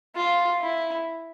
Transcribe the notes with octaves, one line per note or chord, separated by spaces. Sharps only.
F4
E4